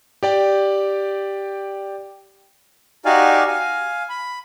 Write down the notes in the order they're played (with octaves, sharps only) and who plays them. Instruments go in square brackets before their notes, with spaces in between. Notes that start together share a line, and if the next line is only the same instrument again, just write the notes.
[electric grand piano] G4 D5 G5
[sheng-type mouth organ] D#4 F#4 G4 D5 F5 G#5
F5 G#5
B5